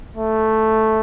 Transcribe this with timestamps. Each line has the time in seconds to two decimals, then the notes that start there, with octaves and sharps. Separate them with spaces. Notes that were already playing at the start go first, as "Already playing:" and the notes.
0.17 A3